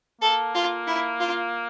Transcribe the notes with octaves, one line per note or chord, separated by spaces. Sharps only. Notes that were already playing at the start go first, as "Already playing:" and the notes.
A#3 A4
F4
E4
F4